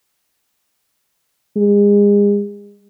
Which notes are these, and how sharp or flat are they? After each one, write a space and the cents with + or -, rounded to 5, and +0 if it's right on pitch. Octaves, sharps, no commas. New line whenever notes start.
G#3 -35